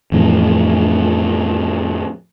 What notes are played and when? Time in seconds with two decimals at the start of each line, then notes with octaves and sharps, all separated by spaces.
0.12 F2 A2 E3